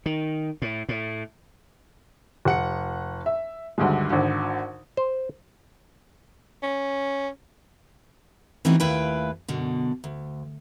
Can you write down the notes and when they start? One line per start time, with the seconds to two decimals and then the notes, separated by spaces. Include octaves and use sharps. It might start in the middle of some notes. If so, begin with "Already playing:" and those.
0.06 D#3
0.62 A2
0.89 A2
2.45 F1 F#5 C#7
3.26 E5
3.78 D2 G2 D3 D#3 G#3
4.10 G#1 D3
4.97 C5
6.62 C#4
8.65 E3 A3 C4 C#4 D#4 F#4
8.80 D#2 A3 E4 F4 B4 G5
9.48 F#2 B2 D3
10.04 D2